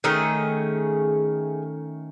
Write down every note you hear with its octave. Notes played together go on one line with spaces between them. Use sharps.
D#3 A3 C#4 G#4